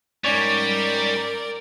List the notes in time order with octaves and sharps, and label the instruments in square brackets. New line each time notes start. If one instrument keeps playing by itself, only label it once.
[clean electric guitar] G#2 C#4 C#5 [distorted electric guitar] G3 [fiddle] A#4 D5